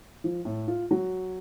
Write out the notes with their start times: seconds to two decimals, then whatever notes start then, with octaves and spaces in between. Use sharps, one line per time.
0.24 F3
0.45 A2
0.68 F4
0.91 F#3